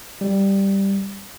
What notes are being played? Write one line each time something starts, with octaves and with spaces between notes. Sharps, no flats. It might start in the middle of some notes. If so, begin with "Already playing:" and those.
G3